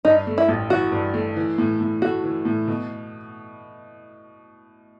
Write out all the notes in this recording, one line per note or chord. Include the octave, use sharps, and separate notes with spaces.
G2 D#4
A3
E4
A1
E3 F#4
G2
A3
E3
A2
A2
A3 F#4
E3
A2
B2